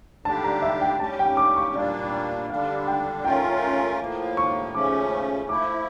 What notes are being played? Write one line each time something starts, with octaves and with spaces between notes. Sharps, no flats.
D3 G3 D4 G4 A5
A#5
E5
G5
G3 C#4 G4 A5
G5
D6
C#6
A#2 G3 A#3 D4 D5
D3 G3 D4 F5
G5
A3 C#4 F4 A#4 G5
A2 F3 A#3
C#6
C#3 F3 A3 C#4 D6
F3 A3 E4 D6